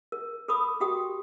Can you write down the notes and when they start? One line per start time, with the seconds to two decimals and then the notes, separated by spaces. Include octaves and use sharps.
0.12 A#4
0.48 A4 A#4 B5 D6 D#6
0.80 F#4 G4 G5 D#6